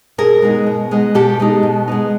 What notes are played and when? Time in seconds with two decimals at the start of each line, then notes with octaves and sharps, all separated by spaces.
0.18 B2 G#4 A#4
0.42 G#3 B3 D#4
0.67 B2
0.91 G#3 B3 D#4
1.15 B2 G4 A4
1.40 G#3 B3 D#4
1.63 B2
1.88 G#3 B3 D#4